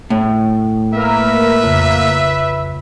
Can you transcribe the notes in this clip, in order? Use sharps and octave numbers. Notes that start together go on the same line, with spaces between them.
A2
A#3 A#4 B4 E5
F2 C#3